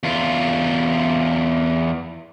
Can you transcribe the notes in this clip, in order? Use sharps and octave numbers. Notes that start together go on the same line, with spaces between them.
E2 F4